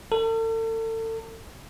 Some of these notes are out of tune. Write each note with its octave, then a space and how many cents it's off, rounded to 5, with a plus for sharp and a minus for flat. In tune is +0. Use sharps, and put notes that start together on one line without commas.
A4 +40